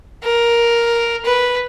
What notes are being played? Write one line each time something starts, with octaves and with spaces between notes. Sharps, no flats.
A#4
B4